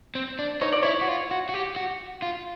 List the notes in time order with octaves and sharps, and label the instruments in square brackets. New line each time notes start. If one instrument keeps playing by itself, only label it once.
[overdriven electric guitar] C4
D4
[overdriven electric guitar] D#4 [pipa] C#5
[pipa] D5
[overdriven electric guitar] E4 [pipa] C#5
[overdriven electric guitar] F#4
F4
F#4
F#4
G4
F#4
F4